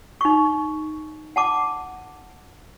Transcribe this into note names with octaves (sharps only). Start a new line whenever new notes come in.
D#4 C#6
F#5 A5 D6